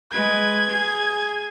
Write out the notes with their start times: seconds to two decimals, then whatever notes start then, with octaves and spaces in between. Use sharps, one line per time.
0.12 G#3 B4 G#6
0.70 G#4